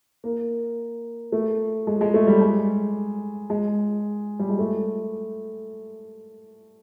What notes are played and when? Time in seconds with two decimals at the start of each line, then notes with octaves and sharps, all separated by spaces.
0.24 A#3
1.32 A3
1.87 G#3
2.01 G#3
2.14 A3
2.27 G3
2.41 G#3
3.50 G#3
4.39 G3
4.49 G#3
4.59 A3